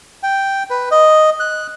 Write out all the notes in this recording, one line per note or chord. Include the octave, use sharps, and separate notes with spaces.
G5
B4
D#5
F#6